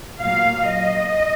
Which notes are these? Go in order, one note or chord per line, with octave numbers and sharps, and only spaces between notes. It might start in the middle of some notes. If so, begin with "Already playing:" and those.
A#2 F#3 A#3 F5
D#5